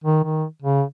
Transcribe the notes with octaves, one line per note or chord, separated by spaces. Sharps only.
D#3
D#3
C#3